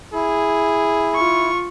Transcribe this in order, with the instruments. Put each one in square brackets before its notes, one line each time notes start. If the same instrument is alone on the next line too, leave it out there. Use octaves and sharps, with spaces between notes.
[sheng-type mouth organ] E4 [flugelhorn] G#4
[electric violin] F4 C#6